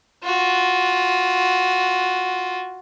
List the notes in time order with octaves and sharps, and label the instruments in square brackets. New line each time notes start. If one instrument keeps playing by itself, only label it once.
[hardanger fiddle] F4 F#4